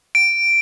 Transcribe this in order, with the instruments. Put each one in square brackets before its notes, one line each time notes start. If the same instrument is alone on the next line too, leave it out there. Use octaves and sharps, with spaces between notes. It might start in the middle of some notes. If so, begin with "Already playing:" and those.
[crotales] D7